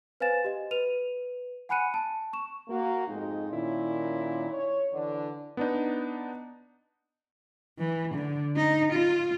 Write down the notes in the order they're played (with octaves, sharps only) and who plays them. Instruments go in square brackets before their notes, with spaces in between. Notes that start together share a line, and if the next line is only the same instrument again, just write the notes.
[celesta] B4 C5 F5 G#5 A6 E7
G4 D#5
B4 D#7 F7
F#5 G#5 B5 F#6 C#7 D#7
A5
C#6 E7
[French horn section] A#3 F#4
F2 G#2 G#3 D#4
A#2 D#3 C#4 E4
C#5
D3 E3 D4
[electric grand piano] B3 D4 D#4
[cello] E3
D3
D#4
F4